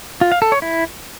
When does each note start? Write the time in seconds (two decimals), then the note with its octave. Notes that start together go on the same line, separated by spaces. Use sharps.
0.21 F4
0.32 F5
0.42 A4
0.52 C#5
0.62 E4